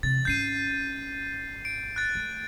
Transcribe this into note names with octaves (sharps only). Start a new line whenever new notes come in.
C3 E3 A6
G#1 C#4 G6 C7 D#7
D7
F#6 A6
A3